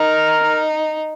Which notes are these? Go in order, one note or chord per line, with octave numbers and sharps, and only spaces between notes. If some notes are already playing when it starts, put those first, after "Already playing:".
Already playing: D#4 A#4
D#4